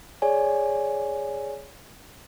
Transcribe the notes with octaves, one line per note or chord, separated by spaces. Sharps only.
G#4 C#5 D5 G#5